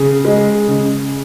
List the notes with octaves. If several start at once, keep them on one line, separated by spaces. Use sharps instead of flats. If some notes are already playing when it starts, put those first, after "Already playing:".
Already playing: C#3 G#4
G#3
C#3